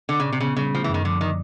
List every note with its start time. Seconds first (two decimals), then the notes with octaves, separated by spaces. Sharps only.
0.09 D3 D4
0.20 C#3
0.25 A#2
0.32 C3
0.40 C#3 B3
0.56 C#3 G3
0.73 F3 A3
0.84 F#2 E3
0.94 D#3
1.05 D3 F3
1.20 D3 D#3